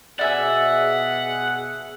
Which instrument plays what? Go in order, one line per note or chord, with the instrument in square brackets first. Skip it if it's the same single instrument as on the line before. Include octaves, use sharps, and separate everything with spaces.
[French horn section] B2 G#4 [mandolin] D5 E5 G#5 [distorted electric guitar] F#5